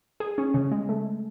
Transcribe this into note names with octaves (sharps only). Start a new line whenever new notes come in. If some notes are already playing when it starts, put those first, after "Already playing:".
G#4
C#4
C#3
G#3
A3